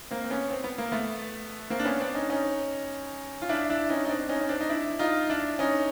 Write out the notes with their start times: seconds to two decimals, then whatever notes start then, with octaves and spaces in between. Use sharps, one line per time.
0.11 A#3 C4
0.24 C4
0.31 B3 C#4
0.51 C4
0.64 B3
0.78 A#3
0.92 A3 B3
1.70 A#3 C4
1.79 D4
1.85 B3 C#4
2.00 C4 D4
2.15 C#4 D#4
2.30 C#4 D#4
3.42 F4
3.49 D4 E4
3.70 D4 E4
3.90 C#4 D#4
4.05 D#4
4.09 C4 D4
4.29 C#4 D#4
4.41 C#4
4.49 C4 D4
4.60 D#4
4.69 D4 E4
4.99 D#4 F4
5.30 D4 E4
5.59 C#4 D#4